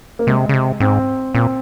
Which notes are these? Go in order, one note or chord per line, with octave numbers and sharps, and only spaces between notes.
A#3
C3 G#3
C#3
C3
G#2 C4
A#2 C4